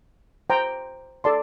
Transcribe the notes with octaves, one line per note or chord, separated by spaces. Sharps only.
C5 G5 A#5
A4 D5 A5 C6